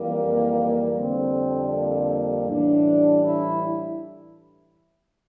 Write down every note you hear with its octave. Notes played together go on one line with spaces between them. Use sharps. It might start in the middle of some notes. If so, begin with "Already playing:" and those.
Already playing: F2 E3 G3 A#3
F2 D3 G3 C4
A#3
A2 E3 G3 D4
E4